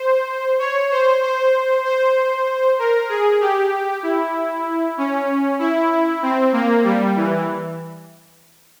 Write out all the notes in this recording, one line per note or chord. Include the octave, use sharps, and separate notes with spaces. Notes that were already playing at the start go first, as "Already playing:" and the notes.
Already playing: C5
C#5
C5
C5
C5
A#4
G#4
G4
E4
C#4
E4
C4
A#3
G3
E3